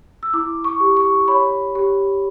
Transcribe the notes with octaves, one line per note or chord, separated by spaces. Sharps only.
E6
E4 D6
C#6
G4
C#6
C#5 B5
G4